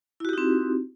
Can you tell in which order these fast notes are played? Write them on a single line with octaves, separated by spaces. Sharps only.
E4 F#4 G4 D#4 C4